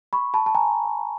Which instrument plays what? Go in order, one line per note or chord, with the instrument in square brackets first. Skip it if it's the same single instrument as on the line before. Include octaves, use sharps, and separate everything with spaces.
[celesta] B5 C#6
A5 B5
A5
G#5 A#5